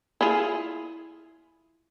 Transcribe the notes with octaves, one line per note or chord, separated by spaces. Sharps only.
E4 F4 G#4